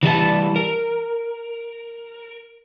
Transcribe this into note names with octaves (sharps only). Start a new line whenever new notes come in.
E3 G3 D#4 A5
A#4